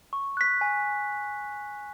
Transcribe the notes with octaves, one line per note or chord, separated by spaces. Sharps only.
C#6
F#6 B6
G#5